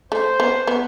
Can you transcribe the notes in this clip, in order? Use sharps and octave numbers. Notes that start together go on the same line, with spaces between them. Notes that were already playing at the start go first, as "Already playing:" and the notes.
A3 C5
B3
B3